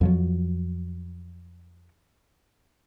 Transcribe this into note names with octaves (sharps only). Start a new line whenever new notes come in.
F2 F3 F#3